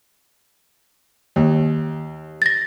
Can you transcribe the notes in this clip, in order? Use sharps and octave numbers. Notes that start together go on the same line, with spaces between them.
D#2
A6 A#6